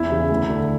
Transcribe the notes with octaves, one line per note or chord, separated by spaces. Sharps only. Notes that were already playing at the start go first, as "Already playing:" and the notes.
Already playing: E2 E4
C#3 E3
D2
D3